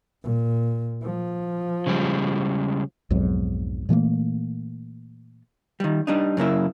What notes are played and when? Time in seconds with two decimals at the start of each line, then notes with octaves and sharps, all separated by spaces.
0.23 A#2
1.03 F3
1.87 C#3 G3 G#3
3.10 B1 F2 G#2 F#3
3.89 A#2 E3 A3 A#3
5.80 D#3 G3
6.07 G3 D4 D#4
6.37 F#2 C#3 A#3 E4